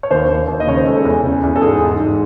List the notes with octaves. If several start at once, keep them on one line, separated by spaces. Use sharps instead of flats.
C#5
D#2 C5
D#2
D#2
D#5
C#3 C#5
C5
G#3 A4
E2
C#3
E2
A4
G#2 G#4
G#2
G#2